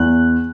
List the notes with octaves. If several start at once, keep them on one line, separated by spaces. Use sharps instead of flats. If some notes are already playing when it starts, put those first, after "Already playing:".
Already playing: E2 F#6